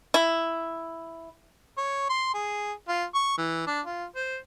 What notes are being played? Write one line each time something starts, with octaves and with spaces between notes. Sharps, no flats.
E4
C#5
C6
G#4
F4
C#6
E3
D4
F4
C5